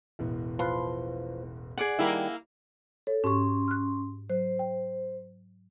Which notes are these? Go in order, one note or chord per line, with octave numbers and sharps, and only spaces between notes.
E1 A1 B3
F3 F4 B4 C6
G#4 D5 F#5
D#3 G3 A#3 E4
A4 C#5
G#2 C#4 G4 C6 C#6
F6 F#6
F#3 C5
G5